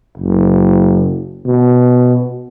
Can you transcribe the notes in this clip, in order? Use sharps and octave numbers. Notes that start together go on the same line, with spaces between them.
F#1
B2